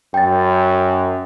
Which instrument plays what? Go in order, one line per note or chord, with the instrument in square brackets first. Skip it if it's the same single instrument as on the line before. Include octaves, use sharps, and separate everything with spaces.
[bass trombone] F#2 [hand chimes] G5 A6